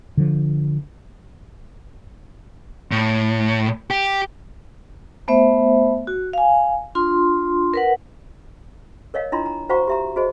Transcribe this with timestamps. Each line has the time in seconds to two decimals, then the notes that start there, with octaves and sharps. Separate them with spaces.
0.17 D3 F3
2.92 A2
3.90 G4
5.28 A3 B3 C5 E5
6.07 F#4
6.33 F5 G#5
6.95 D4 F4 C6
7.74 A#4 B4 F#5
9.14 A#4 C#5 D#5 F5
9.32 D4 E4 F4 D#5 A#5 C6
9.46 A#5
9.69 F#4 C5 F5 F#5 A#5 C#6
9.88 G4 E5 A#5
10.16 F#4 G#4 C5 D#5